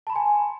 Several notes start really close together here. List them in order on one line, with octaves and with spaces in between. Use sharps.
A5 B5 C6 G#5